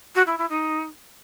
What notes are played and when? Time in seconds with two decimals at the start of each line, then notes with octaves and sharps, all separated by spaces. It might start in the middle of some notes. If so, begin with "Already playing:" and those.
0.15 F#4
0.26 E4
0.38 E4
0.49 D#4